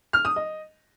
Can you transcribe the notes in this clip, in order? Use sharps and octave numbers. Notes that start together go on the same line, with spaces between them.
F6
D#6
D#5